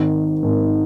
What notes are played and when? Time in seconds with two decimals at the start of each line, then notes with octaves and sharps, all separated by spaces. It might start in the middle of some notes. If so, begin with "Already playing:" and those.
Already playing: G#1 G#2 D#3
0.43 G#1 G#2 D#3